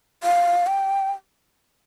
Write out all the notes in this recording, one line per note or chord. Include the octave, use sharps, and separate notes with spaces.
F5
G5